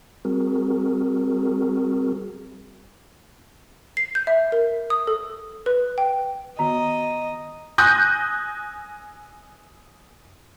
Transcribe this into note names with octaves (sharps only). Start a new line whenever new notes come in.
G3 C4 F#4 G#4 A#4
C7
G6
E5
A#4
D#6
A4
B4
G5
D#3 B3 F#4 D#5 A#5
G#5 D#6 F#6 G6 A#6